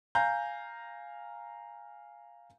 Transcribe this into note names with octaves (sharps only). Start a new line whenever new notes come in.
F5 G#5 A#5 G6